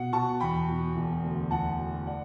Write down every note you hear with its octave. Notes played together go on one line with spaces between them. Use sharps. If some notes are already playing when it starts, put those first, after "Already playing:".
Already playing: B2 F#5
B2 A5 C#6
E2 G5 B5
B2
E1
D2
E1 F#5 A5
D2
D5 F#5